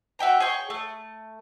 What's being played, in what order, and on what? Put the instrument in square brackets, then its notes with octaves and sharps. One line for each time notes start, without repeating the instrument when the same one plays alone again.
[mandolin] F#4 E5 G5 A#5
G#4 C#5 G5 C#6
A3